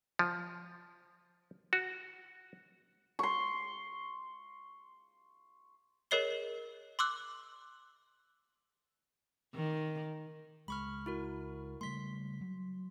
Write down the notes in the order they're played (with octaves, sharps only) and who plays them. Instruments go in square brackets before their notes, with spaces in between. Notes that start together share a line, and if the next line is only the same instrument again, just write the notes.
[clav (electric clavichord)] F3
F#4
[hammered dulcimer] C6 C#6
[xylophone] G#4 A#4 C#5 D#5 C7 G7
C6 D6 E6 F#6
[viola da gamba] D#3
[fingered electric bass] C#2 G#3 [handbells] B5 C#6 F6
[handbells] E4 F#4 A#4
[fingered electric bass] C#3 G3 A3 [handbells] C6 B6
[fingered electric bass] F#3